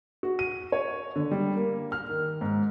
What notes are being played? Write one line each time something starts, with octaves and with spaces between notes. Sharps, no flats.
F#4
D#7
C#5
D3
G3
A#3
F6
D#3
G#2